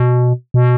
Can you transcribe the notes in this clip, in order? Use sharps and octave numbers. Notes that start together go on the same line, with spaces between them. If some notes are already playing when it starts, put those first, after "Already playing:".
Already playing: B2
B2